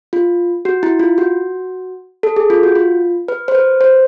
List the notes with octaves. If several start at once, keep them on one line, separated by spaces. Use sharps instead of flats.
F4
F#4
E4
F4
F#4
A4
G#4
F4
F#4
F4
B4
C5
B4
C5